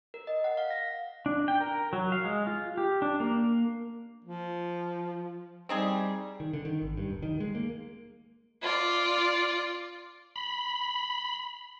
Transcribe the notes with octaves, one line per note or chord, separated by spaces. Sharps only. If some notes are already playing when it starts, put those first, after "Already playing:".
A#4
D#5
F#5
F5
A#6
D4
G5
A#4
F#3
F5
G#3
F4
G4
D4
A#3
F3
G3 C4 D#4 G#4
D#3
D3
D#3
G#1
G2
D1
D#3
G#3
A#3
F4 D5
B5